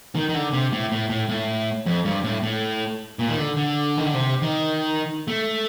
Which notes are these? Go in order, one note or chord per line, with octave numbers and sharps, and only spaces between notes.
D#3
D#3
D3
C3
A2
A2
A2
A2
F2
G2
A2
A2
A#2
D#3
D3
D3
D#3
D3
C3
D#3
A3